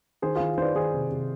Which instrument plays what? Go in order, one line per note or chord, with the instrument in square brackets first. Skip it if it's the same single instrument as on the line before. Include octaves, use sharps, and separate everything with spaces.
[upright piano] D#3 G#4 C5
D#3 F4 G#4
D#3 C5
B4 D5
D#3 G#4 C5
C3
C3